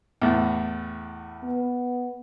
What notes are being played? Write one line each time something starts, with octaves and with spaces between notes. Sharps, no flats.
E2 A2
B3